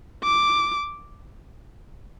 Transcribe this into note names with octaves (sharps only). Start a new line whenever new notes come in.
D6